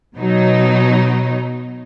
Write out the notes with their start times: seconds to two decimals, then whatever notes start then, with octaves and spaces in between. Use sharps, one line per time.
0.15 B2 F#3 D#4